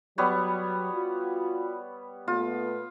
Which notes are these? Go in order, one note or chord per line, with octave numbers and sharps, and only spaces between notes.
F#3 G3 B3 C#5
F4 F#4
A#2 A3 B3 F4